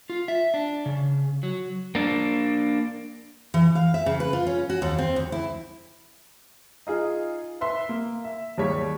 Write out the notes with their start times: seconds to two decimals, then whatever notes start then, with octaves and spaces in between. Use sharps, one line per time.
0.10 F4
0.28 E5
0.54 D4
0.86 C#3
1.43 F#3
1.95 A#3 D4
3.54 E3
3.75 F5
3.94 E5
4.06 C#3
4.20 B4
4.33 F4
4.47 C#4
4.70 F#4
4.82 D#2
4.98 C4
5.16 D2
5.32 E4
6.87 D#4 F4 G#4
7.61 B4 E5 C6
7.89 A#3
8.24 E5
8.58 D#2 G3 G#3 C#5 B6